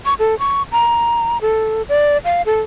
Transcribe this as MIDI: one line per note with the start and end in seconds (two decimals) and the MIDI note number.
0.06 0.14 85
0.19 0.38 69
0.39 0.62 85
0.72 1.38 82
1.42 1.82 69
1.89 2.18 74
2.25 2.42 77
2.46 2.61 69